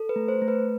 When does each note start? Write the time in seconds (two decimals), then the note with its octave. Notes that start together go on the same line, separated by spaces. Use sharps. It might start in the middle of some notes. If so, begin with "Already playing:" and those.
Already playing: A4
0.09 B4
0.16 A3
0.28 C5
0.41 A3
0.48 B4